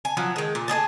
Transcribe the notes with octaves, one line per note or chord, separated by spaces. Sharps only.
G#5
F3 F#3 E4
D#3 G#3
A#2
A3 G#4 D#5 A5